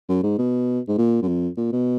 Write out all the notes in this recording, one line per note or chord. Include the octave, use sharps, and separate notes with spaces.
F#2
G#2
B2
G#2
A#2
F#2
F2
A#2
B2